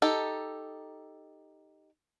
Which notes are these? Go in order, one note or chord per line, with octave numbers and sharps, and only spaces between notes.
D#4 G4 A4